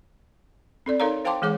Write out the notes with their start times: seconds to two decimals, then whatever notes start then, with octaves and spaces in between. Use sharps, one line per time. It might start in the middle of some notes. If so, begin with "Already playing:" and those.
0.86 C4 A4 D5
1.00 D#4 A4 A#4 C#5 F5 A#5
1.25 C5 F5 G5 A5 C6 D6
1.42 E3 G#3 G#4 C#5 D6